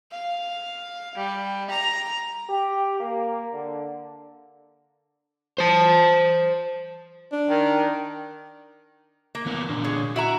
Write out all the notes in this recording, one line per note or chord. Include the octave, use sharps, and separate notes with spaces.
F5
G3
A#5
G4
A#3
D3
C5 A5
D4
D#3
A#3
E3 B3 A#4
A#2 D3 D4
G#4 C#5
E4 F#4 E5 A#5